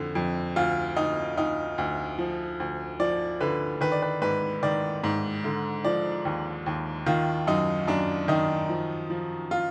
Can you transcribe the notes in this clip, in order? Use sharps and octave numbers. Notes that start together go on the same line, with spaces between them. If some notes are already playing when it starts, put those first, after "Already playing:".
Already playing: F2 D3
F2
D2 F4
D2 D#4
D2 D#4
D2
F3
D2
F3 D5
D3 B4
D#3 B4
D5
B4
G#2 B4
D#3 D5
G#2
D3
F3 D5
D#2
D#2
D#3 F4
F#2 D#4
F#2 D4
D#3 D#4
F3
F3
F4